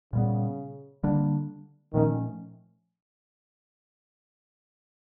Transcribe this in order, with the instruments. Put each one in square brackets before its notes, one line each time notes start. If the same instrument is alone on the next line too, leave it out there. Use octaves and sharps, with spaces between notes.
[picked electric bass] A#2 G3 B3 [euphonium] C#3
[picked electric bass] D3 G3 A#3 D4
[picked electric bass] A#2 F3 A3 C#4 [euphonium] D#3